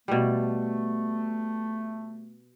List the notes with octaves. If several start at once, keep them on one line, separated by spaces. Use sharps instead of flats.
B2 G3 A3